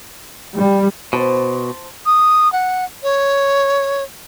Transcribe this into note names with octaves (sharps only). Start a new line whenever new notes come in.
G3
B2 C5 A5
D#6
F#5
C#5